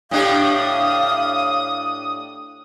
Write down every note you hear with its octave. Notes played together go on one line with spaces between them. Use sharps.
A2 D4 G4 F5 D#6